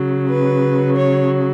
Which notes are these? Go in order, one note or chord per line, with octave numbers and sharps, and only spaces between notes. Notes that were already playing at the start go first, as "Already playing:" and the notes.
Already playing: C#3 F#3
B4
C#5